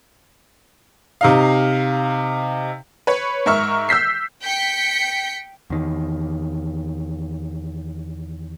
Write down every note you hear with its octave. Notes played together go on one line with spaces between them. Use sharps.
C3 D#4 F5
B4 C#5
G#2 A#4 E5 C#6 F6
E6 G6 B6 C7
G5 G6 B6 C#7
E2 D#3